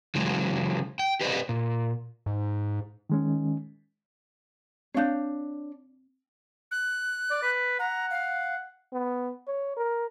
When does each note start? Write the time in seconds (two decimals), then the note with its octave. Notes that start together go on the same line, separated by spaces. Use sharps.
0.15 C#3 E3 F#3 G#3
0.99 G5
1.21 G4 B4 C5 D5 D#5
1.49 A#2
2.26 G#2
3.10 D#3 G#3 C#4
4.95 C4 D4 C#5 F5 G6
6.71 F#6
7.30 D5
7.43 B4
7.79 F#5 A#5
8.10 F5
8.93 B3
9.48 C#5
9.77 A#4